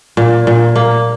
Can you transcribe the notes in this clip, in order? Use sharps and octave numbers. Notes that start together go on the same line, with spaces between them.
A#2
A#2
A#3